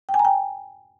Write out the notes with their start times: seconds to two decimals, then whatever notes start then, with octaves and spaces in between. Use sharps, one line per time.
0.09 G5
0.14 G#5
0.19 A#5
0.25 G5